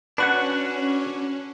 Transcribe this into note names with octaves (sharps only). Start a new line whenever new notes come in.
C#4 D4 F#4 B4 F#5